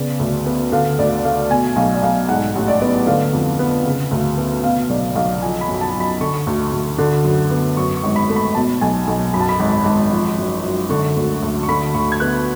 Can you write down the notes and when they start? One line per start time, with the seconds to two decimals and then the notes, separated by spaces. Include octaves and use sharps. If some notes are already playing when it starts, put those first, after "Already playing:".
Already playing: C#3 B3 D5
0.19 D2
0.46 B3
0.72 D3 F5
0.98 D2 D5
1.25 A3 F5
1.50 B2 G#5
1.76 B1 F5
1.94 D5
2.02 B1 F5
2.29 G#2 F#5
2.56 A1
2.68 D5
2.81 B3
3.07 D3 F5
3.33 F2
3.59 B3
3.85 C#3
4.11 D2
4.38 B3
4.64 B2 F5
4.89 B1 D5
5.16 B1 F5
5.42 F3 G#5
5.61 B5
5.69 F#2
5.81 A5
5.94 F#2
6.00 B5
6.20 D3 C#6
6.47 D2
6.72 D2
6.98 D3
7.24 F#2
7.51 B3
7.77 F#2 C#6
7.97 C#6
8.04 G#1
8.16 B5
8.29 A3
8.36 B5
8.55 B2 A5
8.81 B1 G#5
9.07 B1
9.34 F#2 B5
9.40 A5
9.49 B5
9.60 G#1
9.85 G#1
10.12 F3
10.38 F#2
10.63 F#2
10.90 D3 C#6
11.16 D2
11.42 D2
11.63 C#6
11.68 D3 B5
11.94 D2 C#6
12.12 G#6
12.20 B3 F#6